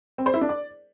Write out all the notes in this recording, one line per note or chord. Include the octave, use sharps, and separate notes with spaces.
C4
C5
E4
D4
D5